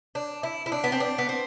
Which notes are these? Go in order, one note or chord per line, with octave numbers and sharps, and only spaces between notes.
D4
E4
E4
D4
B3
C4
D4
B3
C4